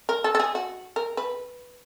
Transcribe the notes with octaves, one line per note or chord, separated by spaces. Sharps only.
A#4
A4
A4
G#4
F#4
A#4
B4